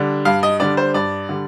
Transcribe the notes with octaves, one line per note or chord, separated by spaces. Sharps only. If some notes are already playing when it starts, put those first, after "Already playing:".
Already playing: D3 G3 D4
G2 F5
D#5
D3 G3 D4 D5
C5
G2 D5
D3 G3